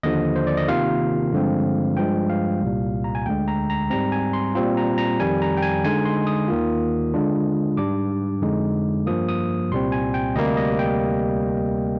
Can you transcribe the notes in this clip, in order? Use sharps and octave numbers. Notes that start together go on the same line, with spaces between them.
D#2 D3 F3 D#5
C5
D5
D#5
C3 D#3 A#3 F4 F5
G2 D3 F3 G#3 C4
G2 F3 G#3 G5
F5
C2 A#2 G3
A#5
G#5
D2 D3 G#3 G5
A#5
A#5
G#2 G3 C4 A#5
G#5
C6
A#2 G3 C4 F4
A#5
A#5
F2 D#3 G3 G#5
A#5
G5
G#5
D3 G#3 D#4 G#5
C6
D#6
D#2 D#3 A#3 F4
D3 G#3 D4 F4
G#2 G3 D4 D6
F2 D3 G#3 D#4
G2 F3 A#3 D#6
D#6
C2 A#2 G3 C4 C6
G#5
G5
D2 C3 G3 A#3 D#5
D#5
G5